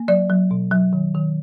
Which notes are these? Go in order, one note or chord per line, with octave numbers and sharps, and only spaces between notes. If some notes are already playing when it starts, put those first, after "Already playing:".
Already playing: A#3
F#3 D5
F#3
B2
F#3
D#3
D#3